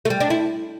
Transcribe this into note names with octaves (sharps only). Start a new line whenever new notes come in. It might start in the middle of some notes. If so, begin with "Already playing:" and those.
A3
G3
D4
E4